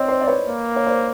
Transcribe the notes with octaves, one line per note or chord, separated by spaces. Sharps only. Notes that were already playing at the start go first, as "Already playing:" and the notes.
Already playing: C4 C#5 D#5
C5 D5
D5
B4 C#5
A#3
C#5
C5 D5